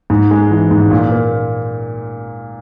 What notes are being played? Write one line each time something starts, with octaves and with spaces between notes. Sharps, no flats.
G#2
G#3
E3
G#2
A#2
A#3